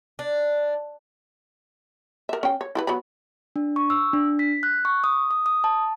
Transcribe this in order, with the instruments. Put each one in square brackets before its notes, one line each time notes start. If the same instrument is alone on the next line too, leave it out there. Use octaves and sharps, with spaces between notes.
[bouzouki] D4
[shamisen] A#4 E5
C#4 G5
C#5
E4 A4 B4
F#3 B3 B5
[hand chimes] D4
C#6
E6
D4
B6
F#6
C#6
D#6
D#6
D#6
A5